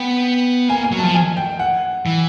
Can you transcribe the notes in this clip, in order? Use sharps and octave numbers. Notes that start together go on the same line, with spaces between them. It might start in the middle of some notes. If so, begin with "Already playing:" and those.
Already playing: B3 G5
A#3 G#5
G#5
F#3
F3 A5
G#5
G5
F#5
E3